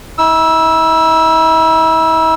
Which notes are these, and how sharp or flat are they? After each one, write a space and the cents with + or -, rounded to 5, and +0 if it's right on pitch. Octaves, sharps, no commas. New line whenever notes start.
E4 -45 E6 +0